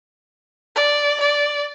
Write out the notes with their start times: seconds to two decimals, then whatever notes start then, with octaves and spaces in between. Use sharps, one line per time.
0.75 D5
1.20 D5